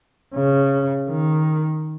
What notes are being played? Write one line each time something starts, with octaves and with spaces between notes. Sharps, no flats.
C#3
D#3